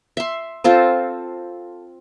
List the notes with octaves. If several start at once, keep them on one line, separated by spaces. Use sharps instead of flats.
E5 C6
C4 F4 A4 C5